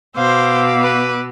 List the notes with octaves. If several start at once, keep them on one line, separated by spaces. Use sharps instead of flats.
B2 C5 F5 D6 E6
B4